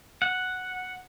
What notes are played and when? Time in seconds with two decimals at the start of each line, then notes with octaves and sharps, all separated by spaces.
0.22 F#5